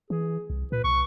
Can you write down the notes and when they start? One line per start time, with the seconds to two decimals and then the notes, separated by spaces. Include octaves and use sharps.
0.10 E3 G#4
0.50 C2
0.72 A#2 B4
0.84 C2 C#6